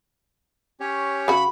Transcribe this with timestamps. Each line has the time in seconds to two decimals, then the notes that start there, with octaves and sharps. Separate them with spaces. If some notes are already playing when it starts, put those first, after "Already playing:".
0.80 C#4 G4 C#5
1.28 C#3 F#4 B5